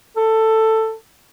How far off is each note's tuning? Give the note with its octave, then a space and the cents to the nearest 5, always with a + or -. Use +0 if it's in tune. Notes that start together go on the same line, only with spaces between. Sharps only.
A4 +10